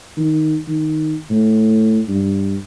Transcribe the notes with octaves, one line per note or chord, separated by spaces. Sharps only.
D#3
D#3
A2
G2